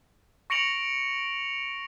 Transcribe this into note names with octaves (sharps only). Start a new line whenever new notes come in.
C#6 A#6 C#7 D7 F7 F#7